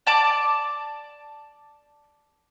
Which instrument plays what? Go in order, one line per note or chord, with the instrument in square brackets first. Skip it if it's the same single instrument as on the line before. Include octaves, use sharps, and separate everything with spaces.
[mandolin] D5 A5 D6